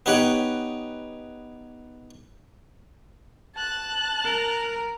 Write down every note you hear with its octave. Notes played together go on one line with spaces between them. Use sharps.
B3 D#4 G4 C#5 F#5 G5
A5 F#6
A#4